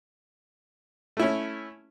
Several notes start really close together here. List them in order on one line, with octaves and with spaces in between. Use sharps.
A3 E4 C#4